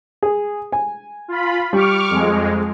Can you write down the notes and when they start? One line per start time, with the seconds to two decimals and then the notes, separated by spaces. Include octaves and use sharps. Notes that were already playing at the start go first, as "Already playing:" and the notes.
0.23 G#4
0.72 G#5
1.28 F4 B5
1.73 G3 C#6 D6 F6
2.10 F2 G#3